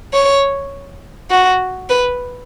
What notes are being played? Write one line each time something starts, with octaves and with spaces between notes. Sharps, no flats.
C#5
F#4
B4